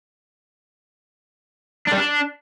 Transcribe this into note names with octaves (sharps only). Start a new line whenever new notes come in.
D4
G3
D4